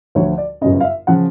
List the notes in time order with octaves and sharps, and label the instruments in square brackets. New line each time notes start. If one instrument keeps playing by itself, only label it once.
[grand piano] D2 D3 F3 C#5
D5
G1 F#2 C#3 D#5
F5
E5
C#3 F3 F#5